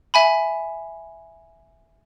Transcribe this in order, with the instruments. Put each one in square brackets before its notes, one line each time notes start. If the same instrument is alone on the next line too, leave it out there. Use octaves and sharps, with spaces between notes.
[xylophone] E5 G#5 B5